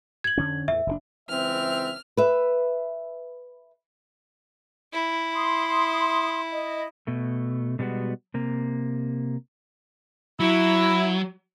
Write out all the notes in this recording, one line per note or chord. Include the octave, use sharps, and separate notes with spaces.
G#6 F#7
F2 D3 C#4
E2 A2 E5
F#1 C#3 D4
C#2 E3 C4 E5 F6
B4 E5
E4
C6 D#6
D#5
B2 A3
B2 G3 G#3 B3 F#4
C3 A#3
F#3 E4